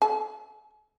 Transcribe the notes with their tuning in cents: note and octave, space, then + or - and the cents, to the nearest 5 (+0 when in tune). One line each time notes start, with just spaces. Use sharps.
A4 -30 G#5 +40